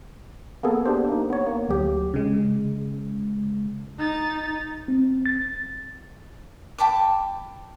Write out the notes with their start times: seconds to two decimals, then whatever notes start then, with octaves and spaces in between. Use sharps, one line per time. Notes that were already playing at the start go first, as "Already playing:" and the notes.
0.63 A#3 B3 G#4 A4
0.86 D4 G4 C5
1.09 A#3 D#4
1.30 B3 C#5
1.46 A#3
1.69 D2 F#3 G4
2.14 C#3 G#3
3.98 D#4 A6
4.88 C4
5.26 A6
6.78 G5 A5 B5 D6